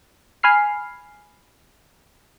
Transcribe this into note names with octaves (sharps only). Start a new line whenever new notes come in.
G#5 B5 F6 C7